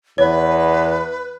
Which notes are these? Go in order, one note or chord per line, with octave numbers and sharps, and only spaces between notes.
E2 B4 C#5